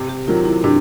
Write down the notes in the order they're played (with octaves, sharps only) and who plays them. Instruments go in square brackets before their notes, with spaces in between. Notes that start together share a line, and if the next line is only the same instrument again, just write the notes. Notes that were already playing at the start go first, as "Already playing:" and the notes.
Already playing: [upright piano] C3
[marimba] G4
[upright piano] D#3 F#3 [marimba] F4
[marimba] E4
[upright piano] C3 [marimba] D4